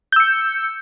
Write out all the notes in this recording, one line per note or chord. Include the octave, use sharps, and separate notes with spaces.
E6 G6 C#7